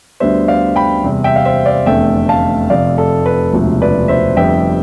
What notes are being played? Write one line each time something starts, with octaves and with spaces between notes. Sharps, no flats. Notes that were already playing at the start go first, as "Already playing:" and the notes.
D2 D3 G3 B3 C5 E5
D5 F5
G5 B5
E2 C3 G3
E5 G5
F5
C5 E5
D5 F5
F1 E2 D3 A3 E5 G5
F5 A5
F1 F2 C3 D5 F5
A4
B4
E1 D2 C3 F3
B4 D5
C5 E5
F1 F2 D3 G3 B3 E5 G5